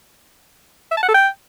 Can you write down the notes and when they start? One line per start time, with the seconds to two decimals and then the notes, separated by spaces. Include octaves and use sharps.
0.91 E5
0.97 A5
1.03 F#5
1.08 A4
1.14 G5